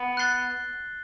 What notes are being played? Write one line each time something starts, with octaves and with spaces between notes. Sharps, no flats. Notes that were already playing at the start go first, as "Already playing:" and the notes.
Already playing: B3
F#6 A6 C7 G7